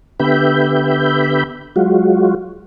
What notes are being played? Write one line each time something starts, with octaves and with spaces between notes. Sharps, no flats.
D3 B3 G4 E5 B5 G6
F#3 G#3 F4 F#4